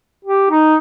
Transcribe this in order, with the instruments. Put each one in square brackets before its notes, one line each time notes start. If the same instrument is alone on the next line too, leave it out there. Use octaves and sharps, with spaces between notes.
[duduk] G4
D#4